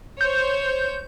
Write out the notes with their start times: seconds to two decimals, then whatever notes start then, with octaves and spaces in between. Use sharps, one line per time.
0.21 C5 C#5 G6